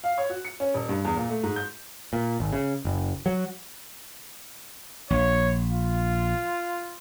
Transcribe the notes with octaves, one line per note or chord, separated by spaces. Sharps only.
F5
C#5
F#4
C#7
C#4
D#1
G2
E2
A#2
A3
G#2
G6
A#2
G#1
C#3
F#1
F#3
A#1 C#5
F4